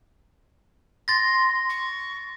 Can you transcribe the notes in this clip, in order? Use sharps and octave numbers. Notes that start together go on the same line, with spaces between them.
C6 A6 A#6
C#6